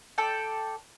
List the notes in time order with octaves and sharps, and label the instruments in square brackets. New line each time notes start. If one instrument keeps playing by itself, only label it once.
[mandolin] A4 D5 G5